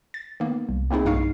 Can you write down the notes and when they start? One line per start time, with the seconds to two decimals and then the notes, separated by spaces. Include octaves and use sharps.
0.14 A6
0.40 D#3 A#3 B3
0.69 C2
0.91 A#3 C4 D#4 E4 G#4
1.05 B1 G2 D#4 F5 C#6 C7